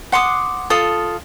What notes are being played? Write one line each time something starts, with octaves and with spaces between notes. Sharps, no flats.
F#5 C6 D6 D#6
F4 A4 D#6